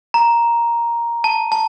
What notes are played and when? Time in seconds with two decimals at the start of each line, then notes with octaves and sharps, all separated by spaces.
0.14 A#5
1.24 A5
1.52 A5